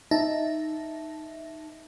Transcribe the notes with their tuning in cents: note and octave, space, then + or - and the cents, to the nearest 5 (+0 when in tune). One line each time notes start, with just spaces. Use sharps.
D#4 +0 E5 +0 A5 -5